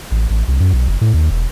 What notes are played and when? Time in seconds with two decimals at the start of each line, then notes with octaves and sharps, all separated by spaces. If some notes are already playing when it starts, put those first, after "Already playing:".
0.11 A1
0.30 A1
0.48 C2
0.60 F#2
0.73 B1
0.88 F#1
1.01 A2
1.14 D#2
1.31 E1